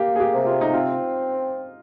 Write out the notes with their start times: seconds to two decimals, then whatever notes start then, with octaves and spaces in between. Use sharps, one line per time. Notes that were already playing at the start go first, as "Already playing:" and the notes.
Already playing: A#3 G4
0.15 G#4
0.20 G4
0.33 C3
0.46 F4
0.61 D#4
0.73 C4 F4